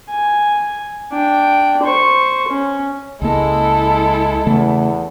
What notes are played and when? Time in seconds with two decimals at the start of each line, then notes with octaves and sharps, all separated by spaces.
0.10 G#5
1.12 D4 G5
1.83 C5 C#6
2.48 C#4
3.22 C#2 G#3 A#3 E4 A4
4.46 E2 C#3 A3